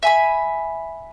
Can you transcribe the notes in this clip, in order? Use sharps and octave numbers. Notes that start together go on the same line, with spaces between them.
E5 G#5 B5